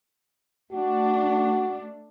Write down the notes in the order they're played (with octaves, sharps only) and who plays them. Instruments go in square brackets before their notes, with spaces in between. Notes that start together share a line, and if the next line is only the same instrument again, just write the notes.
[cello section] A3 D4 [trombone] F#4